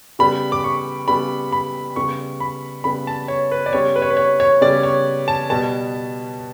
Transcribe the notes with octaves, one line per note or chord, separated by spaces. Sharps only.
C#3 G3 B3 B5
D6
C#6
C#3 G3 B3 B5
B5
C#3 G3 B3 C#6
B5
C#3 G3 B3 B5
A5
C#5
B4
D5
C#3 G3 B3 C#5
B4
C#5
B4
C#5
C#5
C#3 G3 B3 D5
C#5
A5
B2 G3 B3 A5